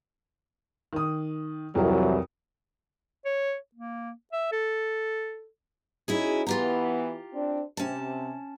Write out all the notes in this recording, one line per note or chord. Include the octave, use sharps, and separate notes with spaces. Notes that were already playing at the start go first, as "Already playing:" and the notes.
D#3 D#6
C2 F2 E3 F#3 A#4
C#5
A#3
E5
A4
C#4 D#4 E4 F#4 G#4
E3 B3 F4 G4 A#5
C4 D4
C3 C#4 A5